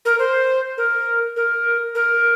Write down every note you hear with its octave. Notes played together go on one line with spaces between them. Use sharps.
A#4
C5
A#4
A#4
A#4